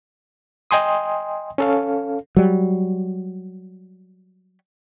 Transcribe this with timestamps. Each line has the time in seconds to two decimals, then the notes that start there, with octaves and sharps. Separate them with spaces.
0.71 D#5 G5 G#5 C6 D#6
1.58 C#4 A4 F5
2.37 F#3 G3